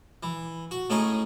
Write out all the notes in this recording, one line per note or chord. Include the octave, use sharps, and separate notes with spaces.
E3
F#4
A2 A3 C#4 D#4 G#4